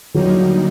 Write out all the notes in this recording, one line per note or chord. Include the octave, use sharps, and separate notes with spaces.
D#2 D3 F#3 G3 A#3 D#4 F#4